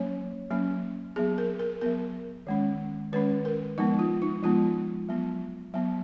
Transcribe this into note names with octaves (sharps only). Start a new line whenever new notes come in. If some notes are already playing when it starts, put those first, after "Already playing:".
Already playing: F#3 A#3 C#4 C#5
F#3 A#3 C#4
F#3 B3 G#4
A#4
A#4
F#3 B3 A#4
D#3 G#3 C#4
D#3 G#3 C#4 B4
A#4
F3 G#3 B3 D#4
F4
D#4
F3 G#3 B3 F4
F#3 B3
F#3 B3